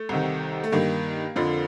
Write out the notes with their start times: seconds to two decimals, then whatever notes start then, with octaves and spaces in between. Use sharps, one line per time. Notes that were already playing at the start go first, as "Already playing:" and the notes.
Already playing: A3
0.09 C2 C3 D#3
0.64 A3
0.72 G2 D#3 A#3
1.36 F2 D3 F3